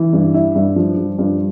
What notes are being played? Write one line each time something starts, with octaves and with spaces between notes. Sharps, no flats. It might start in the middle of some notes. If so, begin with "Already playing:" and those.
Already playing: E3
G2
E4
G2
F3
F3
G2